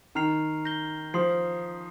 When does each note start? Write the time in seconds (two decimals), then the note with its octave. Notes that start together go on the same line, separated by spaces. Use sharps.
0.15 D#3 A#5 F6 C7 F7
0.65 G6 A#6 G7
1.14 F3 C6 D#6 C7